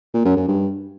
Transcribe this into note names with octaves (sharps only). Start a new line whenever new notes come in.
A#2
F#2
F#2
G2